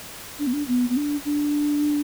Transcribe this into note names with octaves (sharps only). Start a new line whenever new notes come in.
D4
B3
D4
B3
B3
D4
D4